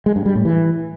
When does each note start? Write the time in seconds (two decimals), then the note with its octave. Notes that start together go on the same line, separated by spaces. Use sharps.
0.06 G#3
0.16 G2
0.26 G3
0.35 A2
0.45 E3